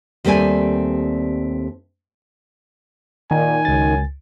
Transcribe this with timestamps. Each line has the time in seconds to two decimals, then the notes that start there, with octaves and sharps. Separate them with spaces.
0.25 D#2 G3 A3 C4 D5 G#5
3.31 A#2 D#3 G#5
3.65 C#2 F#2 A6